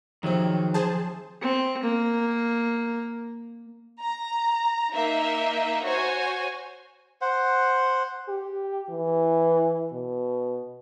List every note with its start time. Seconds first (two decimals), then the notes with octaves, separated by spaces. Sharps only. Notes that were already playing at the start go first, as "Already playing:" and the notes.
0.23 C#2 C3 D#3 F3 F#3 C4
0.74 G#4 C5 A5
1.41 C4
1.83 A#3
4.01 A#5
4.92 A#3 D#4 E5
5.84 F#4 C5 C#5 G#5
7.22 C5 F#5
8.28 G4
8.90 E3
9.92 B2